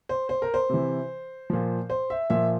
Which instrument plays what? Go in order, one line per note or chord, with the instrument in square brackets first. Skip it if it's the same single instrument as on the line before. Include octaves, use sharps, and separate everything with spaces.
[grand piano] C5
C5
A#4
C5
C3 E3
A#2 F3
C5
E5
A#2 F3 E5